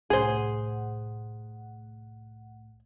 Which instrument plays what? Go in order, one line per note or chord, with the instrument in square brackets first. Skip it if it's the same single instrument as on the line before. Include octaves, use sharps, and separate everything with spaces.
[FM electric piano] C2 A2 F#5 [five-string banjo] G#4 C5